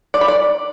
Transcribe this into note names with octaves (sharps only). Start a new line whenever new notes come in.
D5
B5
D5